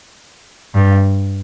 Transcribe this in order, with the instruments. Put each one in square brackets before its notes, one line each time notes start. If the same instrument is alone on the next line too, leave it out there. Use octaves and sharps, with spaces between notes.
[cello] G2